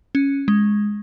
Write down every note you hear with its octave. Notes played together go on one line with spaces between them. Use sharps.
C#4
G#3